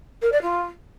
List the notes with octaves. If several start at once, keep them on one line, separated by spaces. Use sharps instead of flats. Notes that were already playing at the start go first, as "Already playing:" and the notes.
A#4
D5
F4